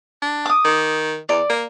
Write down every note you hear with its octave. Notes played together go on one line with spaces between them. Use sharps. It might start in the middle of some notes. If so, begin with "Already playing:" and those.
D4
D6 D#6
D#3
E2 D5
A#3